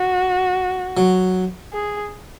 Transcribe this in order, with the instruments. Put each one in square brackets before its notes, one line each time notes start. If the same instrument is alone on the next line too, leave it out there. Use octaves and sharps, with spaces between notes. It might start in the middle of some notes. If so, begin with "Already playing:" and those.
Already playing: [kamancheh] F#4
[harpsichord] F#3
[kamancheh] G#4